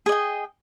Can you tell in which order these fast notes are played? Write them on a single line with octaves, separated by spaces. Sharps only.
G#4 D#5 G5